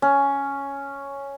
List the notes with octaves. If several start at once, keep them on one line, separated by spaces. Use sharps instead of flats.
C#4